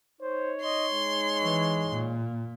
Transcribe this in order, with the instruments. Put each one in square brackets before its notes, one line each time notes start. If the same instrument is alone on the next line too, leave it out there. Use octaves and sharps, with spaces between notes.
[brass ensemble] D#4 C#5 [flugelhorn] C5
[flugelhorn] D#5 [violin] C6
[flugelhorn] G#3
[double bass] E3
A#2